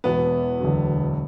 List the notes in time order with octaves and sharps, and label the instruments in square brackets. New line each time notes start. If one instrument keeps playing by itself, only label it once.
[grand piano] E1 E2 B2 [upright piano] B3
[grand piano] E1 D2 D3 F#3